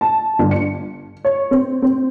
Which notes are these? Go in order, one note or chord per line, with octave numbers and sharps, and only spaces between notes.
A5
G1
C#7
C#5
C4
C4